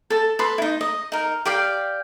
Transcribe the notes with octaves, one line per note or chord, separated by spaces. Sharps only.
A4 A5
A4 B4 C6
D#4 E4
D#5
D#4 A#4
G4 D5 F5 G5